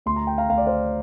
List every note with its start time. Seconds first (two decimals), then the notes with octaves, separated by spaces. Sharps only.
0.06 D2 C6
0.16 A#5
0.27 G5
0.38 F5 A#5
0.49 D2 F5
0.58 D5
0.67 C5 F5